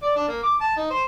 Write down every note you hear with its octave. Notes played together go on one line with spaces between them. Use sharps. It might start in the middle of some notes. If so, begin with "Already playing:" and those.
D5
D4
A#3
D6
A5
D#4
C5